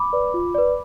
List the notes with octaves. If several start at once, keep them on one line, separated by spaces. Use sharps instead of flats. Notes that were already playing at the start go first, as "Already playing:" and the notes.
Already playing: B5 D6
B4 D5
F4
B4 D5